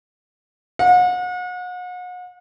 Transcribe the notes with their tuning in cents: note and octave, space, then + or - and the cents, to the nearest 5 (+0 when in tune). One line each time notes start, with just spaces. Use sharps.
F#5 -40